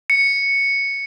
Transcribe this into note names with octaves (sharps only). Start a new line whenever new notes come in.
C#7